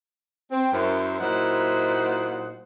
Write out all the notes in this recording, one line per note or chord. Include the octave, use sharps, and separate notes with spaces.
C4
F#2 E4 C5
A#2 F#3 D#4 E4 C5 F#5